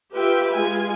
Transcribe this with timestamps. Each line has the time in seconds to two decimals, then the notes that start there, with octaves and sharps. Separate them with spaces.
0.12 F4 G4 B4 E5 G5
0.54 G#3 F4 G#5